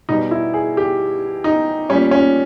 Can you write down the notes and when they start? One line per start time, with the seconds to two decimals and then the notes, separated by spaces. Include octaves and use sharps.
0.09 B2 G3 D#4
0.31 E4
0.54 G#4
0.77 G4
1.44 D#4
1.89 G3 C#4
1.93 A#2
2.11 C#4